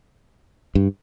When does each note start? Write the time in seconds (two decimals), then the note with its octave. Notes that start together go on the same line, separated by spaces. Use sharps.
0.75 G2